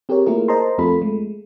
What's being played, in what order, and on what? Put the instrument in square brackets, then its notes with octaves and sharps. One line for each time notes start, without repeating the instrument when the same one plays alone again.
[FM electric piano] C4 G4 G#4 A#4 C#5
A3 A#3 E4 F4 G#4 A#4
A#4 C5 D#5 A5 A#5 C6
F2 A3 C4 F4 A4 B5
G#3 A3